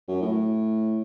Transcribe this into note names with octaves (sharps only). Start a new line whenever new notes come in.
F#2
A2